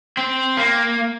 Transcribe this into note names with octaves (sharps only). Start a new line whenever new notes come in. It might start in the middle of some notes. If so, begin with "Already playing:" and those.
C4
A#3